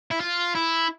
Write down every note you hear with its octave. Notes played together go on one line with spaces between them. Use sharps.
E4
F4
E4